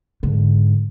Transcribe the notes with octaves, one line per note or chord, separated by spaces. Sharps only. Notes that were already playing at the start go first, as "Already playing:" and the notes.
G#2 D3